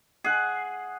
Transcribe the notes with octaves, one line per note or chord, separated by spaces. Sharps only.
G#4 F#5